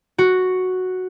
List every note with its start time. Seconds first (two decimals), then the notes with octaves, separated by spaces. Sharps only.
0.18 F#4